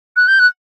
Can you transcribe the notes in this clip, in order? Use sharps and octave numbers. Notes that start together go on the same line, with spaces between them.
F#6
G6
F#6